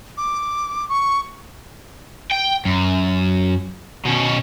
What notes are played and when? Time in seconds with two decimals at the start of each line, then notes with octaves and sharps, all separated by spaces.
0.17 D6
0.89 C#6
2.32 G5
2.65 F#2
4.06 B2 C#4